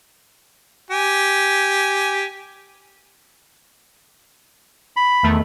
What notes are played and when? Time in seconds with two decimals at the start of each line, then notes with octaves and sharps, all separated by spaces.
0.91 G4 G#5
4.97 B5
5.23 E2 D#3 A3